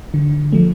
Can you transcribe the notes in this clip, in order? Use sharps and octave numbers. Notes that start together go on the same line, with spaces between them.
D3
F3 A3